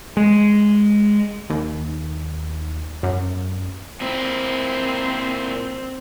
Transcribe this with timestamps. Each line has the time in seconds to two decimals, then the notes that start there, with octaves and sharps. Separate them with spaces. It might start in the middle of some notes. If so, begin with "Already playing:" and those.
0.17 G#3
1.50 D#2
3.03 F#2
4.01 A#2 C4 E4